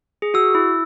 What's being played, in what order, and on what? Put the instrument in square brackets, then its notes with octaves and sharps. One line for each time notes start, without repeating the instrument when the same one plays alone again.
[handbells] G#4
[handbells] F#4 [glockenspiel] E6
[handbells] E4